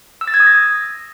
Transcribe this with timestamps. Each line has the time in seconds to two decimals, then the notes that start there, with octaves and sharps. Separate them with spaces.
0.21 E6
0.28 A6
0.34 G#6
0.40 D#6
0.46 A#6